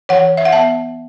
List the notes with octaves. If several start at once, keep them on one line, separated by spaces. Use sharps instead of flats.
E3 C#5 F#5
E5
F#5
B3 E5 A5